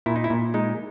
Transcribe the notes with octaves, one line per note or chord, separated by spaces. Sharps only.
A#2 E4
D#4
E4
A#2
G#3 D#4